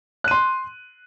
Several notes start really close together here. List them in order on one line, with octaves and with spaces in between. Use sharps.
F#6 D#7 C6